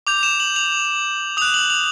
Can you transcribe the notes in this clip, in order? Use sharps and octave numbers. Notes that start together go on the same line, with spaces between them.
D6 G6 F7
E7
F#7
F7
D#6 F#6 F7
F#7
F7